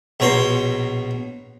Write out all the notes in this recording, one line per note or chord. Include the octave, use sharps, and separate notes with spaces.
A#1 B2 C#5 A#5 C6